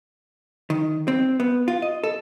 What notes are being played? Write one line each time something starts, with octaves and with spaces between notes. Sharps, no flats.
D#3
C4
B3
F4
D#5
A4